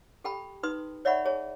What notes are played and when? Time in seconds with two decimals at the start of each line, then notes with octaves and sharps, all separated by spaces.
0.24 G4 A4 G5 A5 B5
0.63 D#4 B4 C6 D#6
1.05 C#5 D5 E5 F#5 B5 C#6
1.25 G#4 C#5 A5